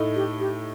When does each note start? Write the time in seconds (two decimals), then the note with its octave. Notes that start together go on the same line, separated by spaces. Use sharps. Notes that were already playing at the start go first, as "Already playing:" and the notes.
Already playing: A2 A3 D#4
0.16 G4
0.40 G4